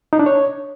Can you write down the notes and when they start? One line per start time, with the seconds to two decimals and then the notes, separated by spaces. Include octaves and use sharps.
0.13 D#4
0.19 D4
0.26 C#5